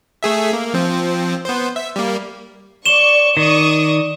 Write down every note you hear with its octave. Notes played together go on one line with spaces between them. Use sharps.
A3 G#4 E5
A#3
F3 C4
B3 C5
E5
G3 A#3
D5 C#6 E7 G7
D#3 D5 C#6 D#6